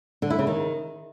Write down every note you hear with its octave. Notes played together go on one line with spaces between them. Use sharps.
D3
E4
C#3
D#3